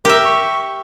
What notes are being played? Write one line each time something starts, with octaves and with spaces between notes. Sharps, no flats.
G4 A#4 E5
C#6